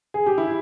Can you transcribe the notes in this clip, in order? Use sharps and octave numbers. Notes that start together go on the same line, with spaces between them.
G#4
G4
E4